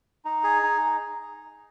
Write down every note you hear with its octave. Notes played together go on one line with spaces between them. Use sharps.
D#4
G#4
D#4